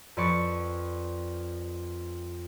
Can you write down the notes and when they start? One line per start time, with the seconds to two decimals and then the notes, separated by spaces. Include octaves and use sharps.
0.17 F2 B4 D5 C#6